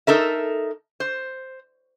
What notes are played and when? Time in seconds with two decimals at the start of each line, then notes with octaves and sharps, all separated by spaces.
0.07 D#4 A4 A#4 E5
1.00 C5